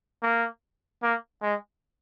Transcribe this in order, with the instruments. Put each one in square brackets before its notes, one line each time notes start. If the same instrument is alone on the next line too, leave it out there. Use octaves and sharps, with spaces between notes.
[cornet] A#3
A#3
G#3